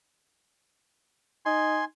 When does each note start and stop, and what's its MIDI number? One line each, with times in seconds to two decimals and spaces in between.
1.46 1.82 63
1.46 1.85 80
1.46 1.85 84